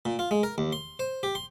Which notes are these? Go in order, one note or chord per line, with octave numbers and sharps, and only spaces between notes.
A#2
F4
G#3
A#4
D#2
C6
C5
G4
C6